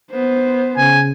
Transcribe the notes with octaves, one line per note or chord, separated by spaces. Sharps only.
B3 C5
C#3 G#5